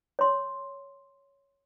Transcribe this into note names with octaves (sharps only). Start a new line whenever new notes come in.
C#5 C6